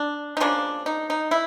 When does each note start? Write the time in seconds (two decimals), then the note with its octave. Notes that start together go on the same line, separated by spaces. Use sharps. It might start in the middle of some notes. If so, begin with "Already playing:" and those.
Already playing: D4
0.37 D#4
0.40 C#3 F3 A#3 D4
0.86 D#4
1.10 D#4
1.31 E4